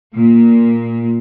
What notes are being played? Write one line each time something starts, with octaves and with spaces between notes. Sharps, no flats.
A#2